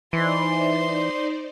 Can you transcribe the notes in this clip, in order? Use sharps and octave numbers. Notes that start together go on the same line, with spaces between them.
E3 D#4 C5 D5 C6